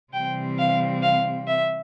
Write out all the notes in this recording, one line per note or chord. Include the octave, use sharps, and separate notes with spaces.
C3 E3 G3 C4 G5
F5
F5
E5